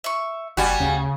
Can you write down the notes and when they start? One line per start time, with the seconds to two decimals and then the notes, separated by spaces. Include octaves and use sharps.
0.04 E5 C#6
0.57 F#1 G3 F#4 F#5 G#5 A5
0.80 D2 C#3